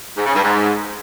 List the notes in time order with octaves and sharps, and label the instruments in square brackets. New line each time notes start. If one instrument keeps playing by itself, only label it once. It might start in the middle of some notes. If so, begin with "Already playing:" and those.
[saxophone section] G#2
C#3
G2
G#2